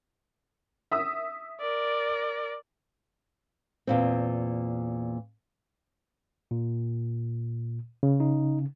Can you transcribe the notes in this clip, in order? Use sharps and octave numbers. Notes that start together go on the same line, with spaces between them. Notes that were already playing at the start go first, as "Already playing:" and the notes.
E5 D#6 E6
A#4 D5
E2 A#2 C4
A#2
C#3
D#4